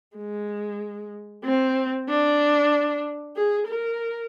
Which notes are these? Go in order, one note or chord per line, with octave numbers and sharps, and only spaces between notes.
G#3
C4
D4
G#4
A#4